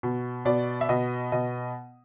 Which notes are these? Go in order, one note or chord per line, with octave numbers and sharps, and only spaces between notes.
B2
B2 D5
E5
B2 D#5
B2 D#5